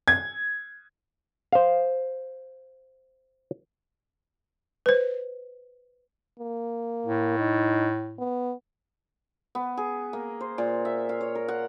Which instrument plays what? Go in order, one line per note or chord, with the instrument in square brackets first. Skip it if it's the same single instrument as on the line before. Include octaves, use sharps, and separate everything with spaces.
[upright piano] G#6
[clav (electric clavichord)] C5 F5
[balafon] B4 C5
[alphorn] A#3
[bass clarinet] A2
[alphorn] D#4
B3
[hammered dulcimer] B3
G#4
A#3
C5
A#2
E5
F5
C#5
A#4
F#5